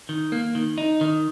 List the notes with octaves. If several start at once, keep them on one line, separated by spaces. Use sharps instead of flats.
D#3
A#3
D#3
D#4
D#3